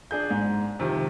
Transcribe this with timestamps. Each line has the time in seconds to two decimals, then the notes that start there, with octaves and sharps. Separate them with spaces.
0.11 D4 G#4 G6
0.31 G#2
0.80 C3 D#3 F3